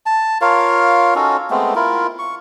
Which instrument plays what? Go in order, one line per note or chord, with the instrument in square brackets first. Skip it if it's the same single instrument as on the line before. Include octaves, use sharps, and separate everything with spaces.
[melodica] A5
F4 A#4 C#5 F5
C#4 D#4 F#4 A4
G#3 A3 B3 C4
E4 F4 A#4
C#6